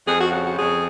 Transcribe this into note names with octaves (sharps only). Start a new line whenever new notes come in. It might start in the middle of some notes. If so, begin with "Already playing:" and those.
F2 G#4
F#4
C#3 F#4
F#4
F2 G#4